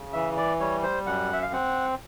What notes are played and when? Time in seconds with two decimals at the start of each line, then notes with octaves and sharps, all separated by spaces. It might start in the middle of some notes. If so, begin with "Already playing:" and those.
Already playing: C#3
0.13 E3 E5
0.37 D5
0.60 G3 C#5
0.83 C5
1.06 F#2 F#5
1.33 E5
1.42 F5
1.52 C4 F#5